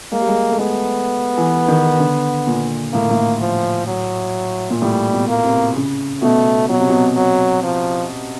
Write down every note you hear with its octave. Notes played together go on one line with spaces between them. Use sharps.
G#3 A#3
G3
G#3
A3
G#3 B3
E3
D#3
D3
A#2
A2 A#3
A2
F3
F#3
A#2
A2 G3
B2
A#3
C3
C#3
B2 A3
B2 F#3
C3
B2
F#3
F3